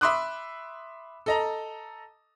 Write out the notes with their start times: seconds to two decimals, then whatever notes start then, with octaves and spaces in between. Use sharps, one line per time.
0.01 E5 B5 C6 D6 D#6 F#6
1.26 A4 D#5 A#5